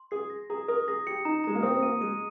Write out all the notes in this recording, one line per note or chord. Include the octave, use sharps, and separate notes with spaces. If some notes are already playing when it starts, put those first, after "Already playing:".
Already playing: C6
G#4 C7
A#6
G#4 A#5
A#4 D#6
G#4 A#6
G4 C#7
D#4 A#5
G#3 A#5
A#3
C4 D#6
C4
A#3 D#7
G#3 D#7